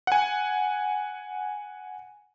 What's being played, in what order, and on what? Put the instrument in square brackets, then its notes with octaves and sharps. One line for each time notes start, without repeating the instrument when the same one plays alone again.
[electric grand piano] F#5 G#5